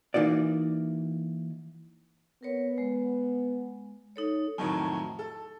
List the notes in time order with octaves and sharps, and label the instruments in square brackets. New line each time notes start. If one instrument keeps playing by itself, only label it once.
[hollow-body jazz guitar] E3 A#3 D#4 F#4 D5
[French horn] B3 [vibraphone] A#4 B4 C#5
[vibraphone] G#3
D#4 A4 C#5
[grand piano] F2 A2 D#3 F#3
A4